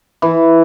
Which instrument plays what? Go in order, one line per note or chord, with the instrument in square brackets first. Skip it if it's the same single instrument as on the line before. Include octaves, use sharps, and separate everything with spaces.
[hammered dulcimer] E3